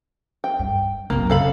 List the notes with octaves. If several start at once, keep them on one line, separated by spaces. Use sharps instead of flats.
G5
G2
C2 F#2 A#3
C#3 A4 F5 B5